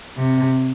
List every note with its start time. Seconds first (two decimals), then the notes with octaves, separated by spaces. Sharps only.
0.18 C3